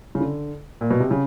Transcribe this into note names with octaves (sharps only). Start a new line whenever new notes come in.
C#3
D3
A#2
B2
C3
C#3